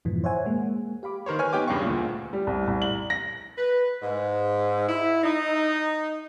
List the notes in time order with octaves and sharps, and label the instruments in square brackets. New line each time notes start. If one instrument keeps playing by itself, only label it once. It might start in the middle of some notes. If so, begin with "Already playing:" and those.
[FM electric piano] F2 G#2 B2 E3 F3
C5 C#5 E5 F#5 G#5
G#3 A#3
G4 F5 B5 D6
[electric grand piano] D#3 A#4 C5 C#5
B4 C#5 G#5 F6
B3 D#4 G4 G5 G#5 D6
E2 G2 C#3 F5 C#6
D2 A#2
[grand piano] G3
C2
C2
F#7
A#6
[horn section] B4
G#2
E4
D#4